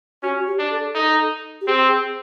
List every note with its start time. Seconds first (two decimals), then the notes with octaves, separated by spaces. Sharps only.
0.23 C#4 F#4
0.47 G4
0.58 D4
0.71 A4
0.94 D#4 A4
1.61 G4
1.67 C4 G#4